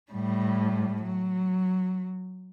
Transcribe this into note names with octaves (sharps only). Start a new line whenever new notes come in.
A2 G3
F#3